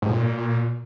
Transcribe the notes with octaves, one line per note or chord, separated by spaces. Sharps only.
G#2
A#2